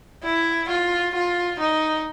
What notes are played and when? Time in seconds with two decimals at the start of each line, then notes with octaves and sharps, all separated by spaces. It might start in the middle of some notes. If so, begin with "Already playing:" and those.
0.24 E4
0.69 F4
1.14 F4
1.59 D#4